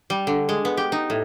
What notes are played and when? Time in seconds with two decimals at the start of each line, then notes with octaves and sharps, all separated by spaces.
0.10 G3
0.27 D3
0.49 G#3
0.65 B3
0.77 G4
0.92 D#4
1.10 A2